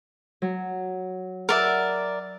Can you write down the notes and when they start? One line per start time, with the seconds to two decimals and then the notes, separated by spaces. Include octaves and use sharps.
0.42 F#3
1.49 A#4 B4 D5 E5 F#5